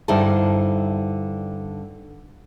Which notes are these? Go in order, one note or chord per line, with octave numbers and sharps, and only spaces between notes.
G2 D3 D#4 E4 C5 A5